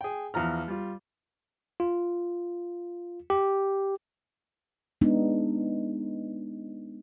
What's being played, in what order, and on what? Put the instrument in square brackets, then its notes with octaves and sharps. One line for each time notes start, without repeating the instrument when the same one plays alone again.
[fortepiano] G#4 G5
E2 F3 A#5 F6
G3 F4
[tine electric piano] F4
G4
[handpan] G#3 B3 D4 D#4